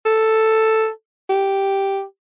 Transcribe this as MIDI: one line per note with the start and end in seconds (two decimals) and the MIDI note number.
0.06 0.89 69
1.29 2.03 67